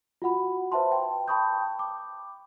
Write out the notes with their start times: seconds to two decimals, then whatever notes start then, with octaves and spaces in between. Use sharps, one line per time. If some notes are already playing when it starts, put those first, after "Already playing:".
0.22 F4 F#4 F#5 B5
0.72 B4 C5 E5 A5 C6
0.92 G5
1.28 G5 A5 B5 C#6 D#6 G6
1.79 D6